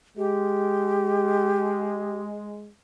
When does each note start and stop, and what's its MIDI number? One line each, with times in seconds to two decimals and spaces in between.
0.17 2.71 56
0.17 2.20 67